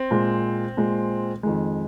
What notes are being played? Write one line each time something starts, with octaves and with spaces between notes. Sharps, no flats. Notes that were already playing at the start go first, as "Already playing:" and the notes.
Already playing: C4
A#2 G#3
A#2 G#3
F2 D#3 G#3